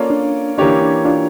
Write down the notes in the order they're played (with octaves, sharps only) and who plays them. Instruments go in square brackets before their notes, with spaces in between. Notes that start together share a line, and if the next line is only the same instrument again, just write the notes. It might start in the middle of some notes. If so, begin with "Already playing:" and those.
Already playing: [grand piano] A#3 C#4 F4 A4 D5
[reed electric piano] D4
[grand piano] E3 A#3 C#4 G4 C#5 [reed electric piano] D4
[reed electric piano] D4
D4 F4